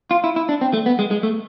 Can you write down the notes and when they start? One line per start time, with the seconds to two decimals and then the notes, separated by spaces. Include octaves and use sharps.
0.11 F4
0.24 E4
0.36 E4
0.49 D4
0.61 C4
0.73 A3
0.86 B3
0.99 G#3
1.11 G#3
1.23 A3